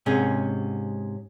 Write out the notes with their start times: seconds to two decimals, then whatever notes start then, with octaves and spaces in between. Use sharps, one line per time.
0.06 G#2 C3 C#4 G#4